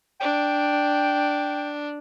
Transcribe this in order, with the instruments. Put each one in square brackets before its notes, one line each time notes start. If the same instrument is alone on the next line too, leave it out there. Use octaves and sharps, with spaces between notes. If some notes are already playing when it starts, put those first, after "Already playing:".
[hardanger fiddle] D4 [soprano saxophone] G5